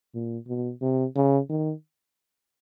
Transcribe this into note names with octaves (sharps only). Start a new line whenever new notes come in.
A#2
B2
C3
C#3
D#3